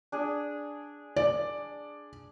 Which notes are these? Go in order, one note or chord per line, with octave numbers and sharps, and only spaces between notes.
D4 G#4
D5